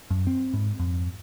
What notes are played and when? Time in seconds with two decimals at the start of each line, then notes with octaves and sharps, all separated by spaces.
0.10 F#2
0.27 C4
0.53 G#2
0.79 F2